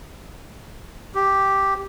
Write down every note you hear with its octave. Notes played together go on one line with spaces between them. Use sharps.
G4